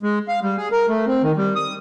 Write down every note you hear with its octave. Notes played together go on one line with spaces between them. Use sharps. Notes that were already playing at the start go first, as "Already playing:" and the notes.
G#3
F5
G3
G#4
A#4
A3
C4
D#3
G3
D#6